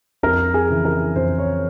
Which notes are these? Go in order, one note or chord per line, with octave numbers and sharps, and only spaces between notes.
F2 A#4
G#4
C#3 E3
A#4
F2 C5
C#5